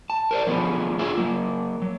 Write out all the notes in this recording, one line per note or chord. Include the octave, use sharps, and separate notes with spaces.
A5
A#4 C5 D5
D3 F3 F#3 G#3 A3 B3
D4 F4 G#4 E5
F#3 A#3
F#3